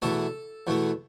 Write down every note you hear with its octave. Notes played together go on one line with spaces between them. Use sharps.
E2 B2 A3 A4
E2 B2 A3